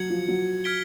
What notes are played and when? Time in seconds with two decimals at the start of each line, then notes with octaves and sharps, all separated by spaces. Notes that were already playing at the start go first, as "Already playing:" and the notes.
Already playing: F#3 G#6 C#7 F#7
0.10 F3
0.28 F#3
0.64 F6 G#6 B6 D7 G7